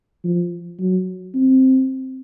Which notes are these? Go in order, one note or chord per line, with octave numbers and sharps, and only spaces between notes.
F3
F#3
C4